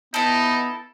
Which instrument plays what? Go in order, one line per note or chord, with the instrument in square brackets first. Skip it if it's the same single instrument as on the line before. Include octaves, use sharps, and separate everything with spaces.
[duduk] B3 [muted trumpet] D#4 [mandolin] E4 A4